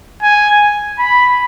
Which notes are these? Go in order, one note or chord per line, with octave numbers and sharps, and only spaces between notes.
G#5
B5